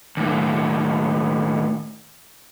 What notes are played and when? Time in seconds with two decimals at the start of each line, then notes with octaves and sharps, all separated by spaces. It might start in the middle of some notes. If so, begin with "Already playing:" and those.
0.17 D#2 A2